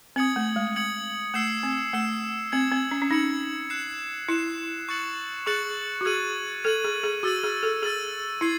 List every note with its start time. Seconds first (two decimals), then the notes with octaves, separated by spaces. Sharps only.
0.16 C4 D#6 G#6 C#7 F#7
0.36 A3
0.56 G#3
0.76 D#6 G#6 C#7 F#7
1.34 A3 E6 C7 E7
1.63 C4
1.94 A3 E6 C7 E7
2.52 C4 G#6 C#7 F#7
2.72 C4
2.91 C#4
3.02 C#4
3.11 D#4 G#6 C#7 F#7
3.70 F#6 C7 E7
4.28 E4 F#6 C7 E7
4.88 C#6 F#6 A6 C#7 F#7
5.46 G#4 C#6 F#6 A6 C#7 F#7
6.01 F#4
6.05 G#4 G#6 D#7 F#7
6.64 A4 G#6 D#7 F#7
6.84 G#4
7.03 G#4
7.23 F#4 E6 A6 D#7 F#7
7.44 G#4
7.63 A4
7.82 G#4 E6 A6 D#7 F#7
8.41 E4 G#6 C7